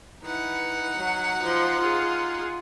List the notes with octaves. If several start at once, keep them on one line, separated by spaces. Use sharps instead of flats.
E3 D#4 F#5
F#3
F3
F4 G#4